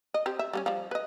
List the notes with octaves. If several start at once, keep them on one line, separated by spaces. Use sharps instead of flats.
D#5
C4 G4
E5
G3 B3 C#4
F3 G3
B4 D#5